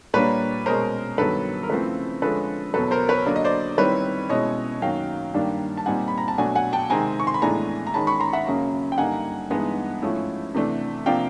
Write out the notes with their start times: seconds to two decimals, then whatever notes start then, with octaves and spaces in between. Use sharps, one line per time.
0.14 A#2 G3 A#3 D4 B4 C#5
0.66 B2 G#3 C#4 A#4 C5
1.18 G2 D#3 F#3 B3 A4 B4
1.63 A#4
1.70 C#3 F3 A3 C4 E4 A4 B4
2.22 D3 F3 G#3 C#4 A4 B4
2.74 E2 B2 F#3 A4 B4
2.91 A#4 C5
3.09 B4 C#5
3.26 D3 F#3 A#3 D5
3.36 D#5
3.45 C5 D5
3.78 D#3 G3 C4 E4 B4 C#5
4.29 B2 G#3 C#4 E4 C#5 D#5
4.82 F#2 D#3 F#3 A#3 F5 G5
5.34 G2 D#3 G3 A#3 D4
5.77 A5
5.86 A#2 G3 C4 D#4 F#5 G#5
6.08 B5
6.18 A#5
6.28 A5
6.38 B2 F#3 A3 D4 F#5 G#5
6.55 F#5 G#5
6.73 G5 A5
6.90 C3 D#3 G#3 C4 G#5 A#5
7.20 C#6
7.27 C6
7.34 B5
7.42 A2 E3 G#3 B3 D4 G#5 A#5
7.87 A#5
7.94 D#3 G#3 C#4 A5 B5
8.07 B5 C#6
8.20 A#5 C6
8.33 E5 F#5
8.46 F#2 C#3 F#3 A#3
8.92 G5
8.98 G2 D3 G3 A#3 D#4 F#5 G#5
9.50 G2 E3 G#3 B3 D#4
10.02 G#2 F3 A3 C#4 E4
10.54 C3 E3 A3 D4
11.06 C3 F3 A#3 D4 F5 G5